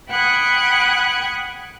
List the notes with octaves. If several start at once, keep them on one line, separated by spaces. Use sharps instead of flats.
F#5 G5 B5 D#6 F#6 G#6